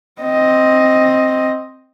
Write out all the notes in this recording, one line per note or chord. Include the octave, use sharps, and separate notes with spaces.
C4 D#5